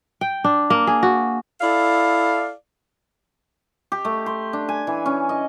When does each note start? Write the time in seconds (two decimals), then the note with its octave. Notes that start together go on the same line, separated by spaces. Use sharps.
0.21 G5
0.44 D4
0.70 A#3
0.87 G#4
1.03 F#4
1.61 E4 A4 D5 F5
3.92 G4
4.05 A3
4.26 C6
4.53 D4
4.69 G#5
4.87 E3
5.06 C#4
5.29 D#5